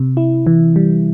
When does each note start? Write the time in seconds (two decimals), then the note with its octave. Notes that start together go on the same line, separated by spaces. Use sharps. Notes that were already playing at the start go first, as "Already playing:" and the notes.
Already playing: C3
0.17 E4
0.47 E3
0.76 G3